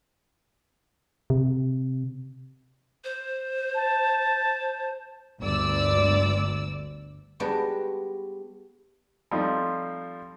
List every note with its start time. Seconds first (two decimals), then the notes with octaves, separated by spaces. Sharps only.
1.30 C3
3.04 C5
3.75 A5
5.40 G1 D2 D5 E6
7.40 G3 G#3 B3 D4 F#4 G4
9.31 F3 G3 A3 C4 D#4 F4